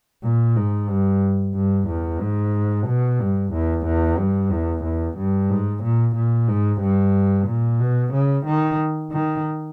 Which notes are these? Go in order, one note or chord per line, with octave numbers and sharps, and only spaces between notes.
A#2
G#2
G2
G2
E2
G#2
B2
G2
E2
E2
G2
E2
E2
G2
G#2
A#2
A#2
G#2
G2
A#2
B2
C#3
D#3
D#3